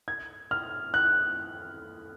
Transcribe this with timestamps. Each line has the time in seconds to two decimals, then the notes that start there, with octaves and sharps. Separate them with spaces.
0.08 G#6
0.51 F6
0.94 F#6